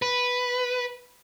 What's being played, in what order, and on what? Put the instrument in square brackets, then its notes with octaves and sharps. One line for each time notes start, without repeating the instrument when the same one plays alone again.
[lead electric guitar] B4